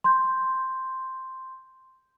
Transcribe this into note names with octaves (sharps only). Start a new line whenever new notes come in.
C6 G6